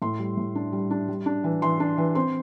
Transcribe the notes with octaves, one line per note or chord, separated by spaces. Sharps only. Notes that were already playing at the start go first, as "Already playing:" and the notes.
A2 C6
G3
A2
D4
G3
D4
G3
D4
E3
E3 C6
D4
E3
C4 C6